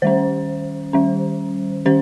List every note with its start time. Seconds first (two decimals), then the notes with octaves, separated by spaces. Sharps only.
0.02 D#3 G3 C#4 C5
0.93 D#3 G3 C#4
1.86 D#3 G3 C#4 C5